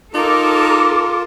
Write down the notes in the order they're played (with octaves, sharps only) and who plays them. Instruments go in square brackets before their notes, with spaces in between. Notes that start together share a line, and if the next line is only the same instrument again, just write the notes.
[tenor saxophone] D#4 [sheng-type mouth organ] F4 [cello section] A4 A#4 [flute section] D6